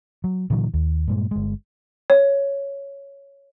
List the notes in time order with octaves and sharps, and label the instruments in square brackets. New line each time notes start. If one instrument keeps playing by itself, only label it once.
[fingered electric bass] F#3
A#2 D3 E3 F#3
D#2
G2 A#2 G#3
G1 G#3
[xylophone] C#5